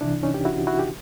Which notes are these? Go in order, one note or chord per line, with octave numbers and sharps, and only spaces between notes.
C2 C3 E3 D4 E4
C#4 D#4
G4
E4 F#4
E4 F#4
G4